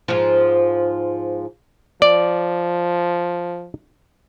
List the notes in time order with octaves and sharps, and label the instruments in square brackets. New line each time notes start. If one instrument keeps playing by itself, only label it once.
[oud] G#2 F3
[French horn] F3 [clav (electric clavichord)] D5